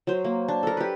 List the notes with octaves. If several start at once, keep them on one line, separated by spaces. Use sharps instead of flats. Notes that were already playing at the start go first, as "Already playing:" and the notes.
F#3 C5
A#3
D4
A4 A#4
G4 B4